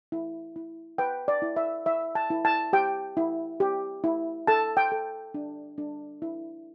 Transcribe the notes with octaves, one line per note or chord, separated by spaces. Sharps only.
E4
E4
B4 G5
D5
E4
E5
E4 E5
A5
E4
A5
G4 G5
E4
G4
E4
A4 A5
G5
A4
D4
D4
E4